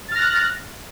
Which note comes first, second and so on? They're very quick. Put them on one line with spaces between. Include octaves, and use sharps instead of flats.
A6 F6 A#6 F#6